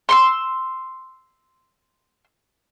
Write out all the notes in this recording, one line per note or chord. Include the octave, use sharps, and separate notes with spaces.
C6 C#6 E6